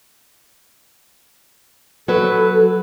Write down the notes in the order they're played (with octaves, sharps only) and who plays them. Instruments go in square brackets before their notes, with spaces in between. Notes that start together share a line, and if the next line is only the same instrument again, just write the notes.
[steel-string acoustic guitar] F#3 B4 [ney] A4